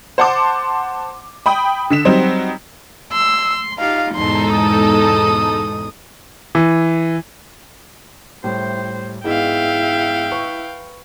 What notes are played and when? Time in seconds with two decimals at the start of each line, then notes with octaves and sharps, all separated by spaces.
0.18 C5 F#5 A5 C6 D6
1.46 G5 B5 D#6
1.90 D3 B6 E7
2.05 F#3 G3 C4 D#4
3.12 C6 E6
3.79 D#4 F4 G4 F5
4.15 E2 G#2 B2 G#3 D#4 A4 C6
4.54 D#6
6.55 E3
8.44 A2 G3 C5
9.24 G#2 G#3 B3 E4 E5 F5 G5
10.31 B4 C#6